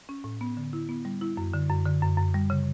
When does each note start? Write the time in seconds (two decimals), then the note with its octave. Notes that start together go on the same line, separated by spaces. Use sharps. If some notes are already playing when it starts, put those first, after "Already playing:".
0.09 C#4
0.24 A2
0.41 B3
0.57 D3
0.73 E4
0.89 B3
1.05 G3
1.21 E4
1.37 F#2
1.53 D3
1.70 F#2
1.86 D3
2.02 F#2
2.17 F#2
2.34 G3
2.50 C#3